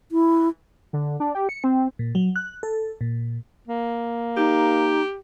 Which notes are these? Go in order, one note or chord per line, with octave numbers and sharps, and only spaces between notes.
E4
D3
D4
G4
C#7
C4
A#2
F#3
F#6
A4
A#2
A#3
D#4 G4